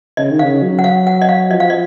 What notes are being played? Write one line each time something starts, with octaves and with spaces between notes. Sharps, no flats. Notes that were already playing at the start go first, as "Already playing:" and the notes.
C#3 D#5
D#3
F5
C#3
F#3
F#5
F5
F#5
D#5
F5
F3 D#5
F5
D#5